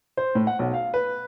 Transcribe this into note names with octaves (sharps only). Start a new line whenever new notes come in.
C5
A2
F#5
B1
F5
B4